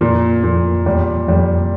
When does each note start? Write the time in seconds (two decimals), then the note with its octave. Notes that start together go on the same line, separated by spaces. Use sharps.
0.01 F2 A#2
0.44 F2 A#2
0.86 E2 G3
1.28 F2 G3